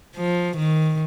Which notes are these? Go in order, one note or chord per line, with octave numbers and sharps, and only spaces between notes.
F3
D#3